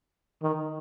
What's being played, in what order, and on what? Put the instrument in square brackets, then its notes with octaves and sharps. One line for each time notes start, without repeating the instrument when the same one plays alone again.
[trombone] D#3